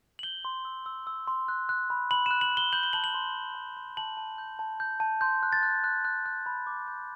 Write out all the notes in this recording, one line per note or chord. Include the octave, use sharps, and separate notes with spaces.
F#7
G6 G7
C6
E6
E6
E6
C6
F#6
F#6
B5
B5 F#7
E7
F#6
F#7
F#6
G7
G6 F#7
G7
A5 F#7
F#7
C6
C6
A5
C6
A5 F#7
A5
G6
A5
G6
A5
C6 G6
F#6
A6
F#6
F#6
F#6
F#6
B5
D6
G6